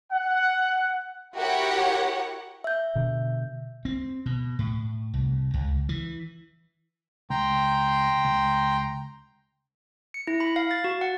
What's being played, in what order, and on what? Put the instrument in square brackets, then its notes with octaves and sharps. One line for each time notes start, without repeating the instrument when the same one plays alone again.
[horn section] F#5
[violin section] E4 F#4 G4 A#4 C#5 F#5
[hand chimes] E5 G6
[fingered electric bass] B2 D3
[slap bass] C4
B2
A2
C2
C#2
E3
[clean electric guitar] C#2 [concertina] G5 A#5 C6
[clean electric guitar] C#2
[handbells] C#7
E4
B5
F5
A6
F#4
F#5